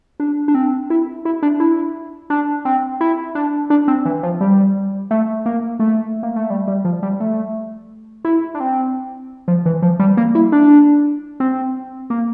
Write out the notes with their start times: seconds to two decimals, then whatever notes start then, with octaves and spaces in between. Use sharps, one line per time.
0.20 D4
0.48 D4
0.55 C4
0.90 E4
1.25 E4
1.43 D4
1.60 E4
2.30 D4
2.65 C4
3.01 E4
3.35 D4
3.70 D4
3.88 C4
4.05 E3
4.23 F3
4.41 G3
5.11 A3
5.46 A#3
5.80 A3
6.23 A#3
6.36 A3
6.50 G3
6.67 G3
6.85 F3
7.03 G3
7.20 A3
8.25 E4
8.55 D4
8.60 C4
9.48 F3
9.66 E3
9.82 F3
10.00 G3
10.17 A#3
10.35 E4
10.52 D4
11.40 C4
12.10 A#3